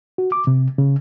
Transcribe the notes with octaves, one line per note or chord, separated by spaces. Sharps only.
F#4
D6
C3
C#3